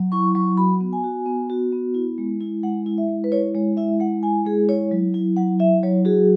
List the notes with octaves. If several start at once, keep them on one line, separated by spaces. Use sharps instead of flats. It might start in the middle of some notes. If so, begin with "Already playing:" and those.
Already playing: F#3
E4 C#6
F#3 C#6
F#4 B5
B3
G#5
F#4
B3
F#4
B3
E4
G#3
E4
G#3 F#5
E4
E5
G#3
B4
E4 C#5
G#3 C#5
E4 E5
G#3 F#5
E4 G#5
G#3 G#4
E4 C#5
F#3
E4
F#3 F#5
E4 E5
F#3 C#5
F#4 G#4